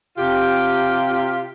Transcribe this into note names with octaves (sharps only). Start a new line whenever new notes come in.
C3 F4 G4